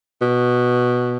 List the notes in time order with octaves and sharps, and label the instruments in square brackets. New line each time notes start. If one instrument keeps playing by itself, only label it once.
[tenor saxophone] B2